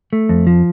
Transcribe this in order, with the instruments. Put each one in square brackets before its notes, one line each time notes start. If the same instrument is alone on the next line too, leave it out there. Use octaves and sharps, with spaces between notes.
[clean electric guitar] A3
F2
F3